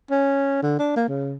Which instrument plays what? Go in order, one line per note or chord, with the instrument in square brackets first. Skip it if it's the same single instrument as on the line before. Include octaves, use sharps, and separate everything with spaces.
[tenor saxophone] C#4
D3
D4
A#3
C#3